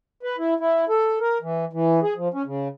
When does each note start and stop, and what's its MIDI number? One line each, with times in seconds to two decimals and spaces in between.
0.23 0.36 71
0.38 0.54 64
0.60 0.85 64
0.89 1.19 69
1.20 1.38 70
1.42 1.65 52
1.73 2.00 52
2.02 2.14 68
2.16 2.28 53
2.34 2.43 61
2.46 2.68 49